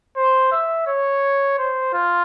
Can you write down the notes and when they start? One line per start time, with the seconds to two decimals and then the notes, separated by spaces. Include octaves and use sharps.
0.16 C5
0.52 E5
0.87 C#5
1.58 C5
1.94 F4